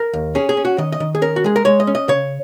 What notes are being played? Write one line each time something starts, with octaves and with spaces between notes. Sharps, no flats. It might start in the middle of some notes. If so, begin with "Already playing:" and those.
Already playing: A#4
D#2
C#4 G#4
G#4
C#4
F#4
D#3 D#5
D#5
D#3
G#4
C#4 A#4
F#4
G#3 G#4
A#4
G#3 C#5
D#5
C#4
D#5
C#3 C#5